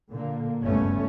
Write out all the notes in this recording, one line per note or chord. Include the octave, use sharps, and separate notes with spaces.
A#2 D3 A#3
F#1 C#2 G2 A3 B3 C#4